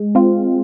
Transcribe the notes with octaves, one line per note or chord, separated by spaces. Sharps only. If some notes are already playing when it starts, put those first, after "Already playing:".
Already playing: G#3
C4 F4